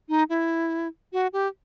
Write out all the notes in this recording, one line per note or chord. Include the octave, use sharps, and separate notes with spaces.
D#4
E4
F#4
G4